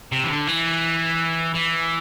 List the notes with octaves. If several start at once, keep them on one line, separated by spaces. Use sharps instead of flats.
C3
E3
D3
E3
E3